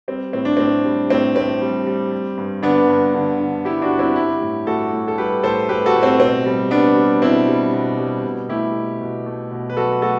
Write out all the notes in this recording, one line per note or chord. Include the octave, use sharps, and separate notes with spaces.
G3 C4
A2 C4
D4
A2 C4
G3
A2 C4
A2 C4
G3
G3
G3
G2
D3 B3 D4
G2
D3
D3
G3 E4 G4
D4 F#4
G2
C4 E4
G3 E4 G4
A2
A2 F#4 A4
A2
A4
G3 G4 B4
A2 A4 C5
A2 G4 B4
F#4 A4
A2
C4
B2 C4
G3
G3 B3 D4
G3
B2 C4 E4
G3
B2
G3
B2
A3 E4 G4
B2
B2
A3
B2
B4
F#3 F#4 A4
A3 F#4 A4